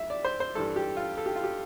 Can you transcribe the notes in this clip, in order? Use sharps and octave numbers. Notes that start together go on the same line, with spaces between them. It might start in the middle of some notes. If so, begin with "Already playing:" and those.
Already playing: F2 E5
D5
C5
C5
G2 E3 G3 A4
G4
F4
A4
G4
F4
G4